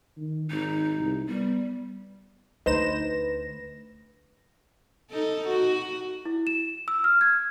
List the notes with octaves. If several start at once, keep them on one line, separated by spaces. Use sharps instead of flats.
D#3
G#1 D#4
C2
G3 B3
D2 D#4 B4 C5 A#6 E7
D#4 A4
F#4
E4
E7
E6
F6
G#6